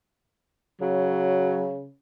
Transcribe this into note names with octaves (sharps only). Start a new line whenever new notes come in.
C#3 F#3